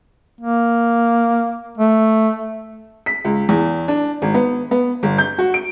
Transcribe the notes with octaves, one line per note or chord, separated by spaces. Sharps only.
A#3
A3
B6
C#2
E2
D4
G#1
B3
B3
G1
G6
F#4
D7